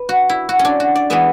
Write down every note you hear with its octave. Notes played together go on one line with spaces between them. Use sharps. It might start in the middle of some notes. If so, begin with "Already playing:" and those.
Already playing: B4
F#4
E4
F#4
C#4
D4
F#4
D5
E3 G#3 B3 E5